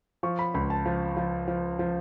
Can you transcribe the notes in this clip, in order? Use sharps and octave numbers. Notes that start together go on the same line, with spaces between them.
F3 C#6
B5
C#2 B5
A5
F3
F3
F3
F3